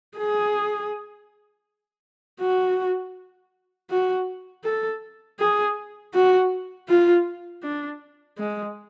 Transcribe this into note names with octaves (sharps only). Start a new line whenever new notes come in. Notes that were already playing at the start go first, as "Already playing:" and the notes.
G#4
F#4
F#4
A4
G#4
F#4
F4
D4
G#3